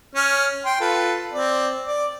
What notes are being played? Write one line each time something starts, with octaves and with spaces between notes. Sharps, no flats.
C#4 F6
G5 C6
F4 A4 B4
C4 D5
D5 D6